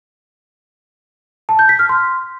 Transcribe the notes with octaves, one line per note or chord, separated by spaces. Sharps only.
A5
G6
B6
F6
C6